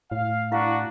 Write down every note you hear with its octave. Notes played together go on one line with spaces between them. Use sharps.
A2 F5
D4 E4 F#4 F5